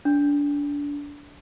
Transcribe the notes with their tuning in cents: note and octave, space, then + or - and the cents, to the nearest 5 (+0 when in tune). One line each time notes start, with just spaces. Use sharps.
D4 -25